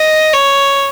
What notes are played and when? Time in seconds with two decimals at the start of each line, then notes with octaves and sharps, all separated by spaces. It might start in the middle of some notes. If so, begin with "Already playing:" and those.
Already playing: D#5
0.34 C#5